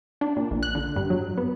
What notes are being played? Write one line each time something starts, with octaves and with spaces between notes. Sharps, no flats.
D4
A#2
A#1
F#6
D3
G2
F#3
B3